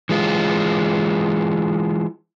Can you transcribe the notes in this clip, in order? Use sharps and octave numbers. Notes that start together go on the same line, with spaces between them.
E3 G#3 F4